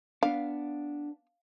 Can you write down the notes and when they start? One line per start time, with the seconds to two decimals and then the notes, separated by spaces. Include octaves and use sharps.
0.23 B3 D4 F5